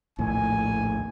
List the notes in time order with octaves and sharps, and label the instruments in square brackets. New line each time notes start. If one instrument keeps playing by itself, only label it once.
[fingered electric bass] A#1 D#2 A2 [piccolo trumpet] G#5